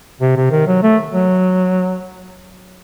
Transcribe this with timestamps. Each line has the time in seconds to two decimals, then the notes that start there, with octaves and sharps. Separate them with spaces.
0.21 C3
0.37 C3
0.51 D#3
0.67 F#3
0.83 A3
1.13 F#3